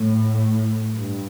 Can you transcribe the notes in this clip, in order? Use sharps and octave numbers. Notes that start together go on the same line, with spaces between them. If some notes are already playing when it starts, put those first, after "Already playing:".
Already playing: A2
G2